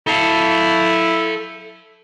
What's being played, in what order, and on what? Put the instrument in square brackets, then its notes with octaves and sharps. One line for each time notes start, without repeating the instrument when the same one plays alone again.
[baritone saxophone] E4 [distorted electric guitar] A4 F5